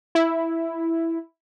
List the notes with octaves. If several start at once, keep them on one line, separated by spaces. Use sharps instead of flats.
E4